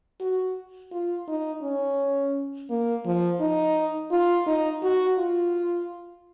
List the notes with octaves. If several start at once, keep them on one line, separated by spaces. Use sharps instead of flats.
F#4
F4
D#4
C#4
A#3
F3
D#4
F4
D#4
F#4
F4